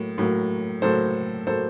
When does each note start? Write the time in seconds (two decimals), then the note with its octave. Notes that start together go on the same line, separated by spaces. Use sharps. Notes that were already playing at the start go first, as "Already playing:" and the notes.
Already playing: A2 F#3 A#3
0.18 A2 F#3 A#3
0.82 A2 F#3 A#3 A4 C5
1.47 A2 F#3 A#3 A4 C5